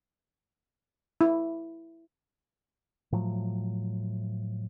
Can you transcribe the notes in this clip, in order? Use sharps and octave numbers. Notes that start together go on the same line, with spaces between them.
E4
A2 F3 F#3